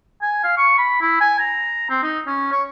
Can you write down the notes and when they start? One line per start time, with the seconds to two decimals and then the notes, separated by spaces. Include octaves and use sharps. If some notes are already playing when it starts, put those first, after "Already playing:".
0.22 G#5
0.44 F5
0.58 C#6
0.78 B5
1.02 E4
1.21 G#5
1.39 A#5
1.90 C4
2.03 D#4
2.27 C#4
2.52 C#5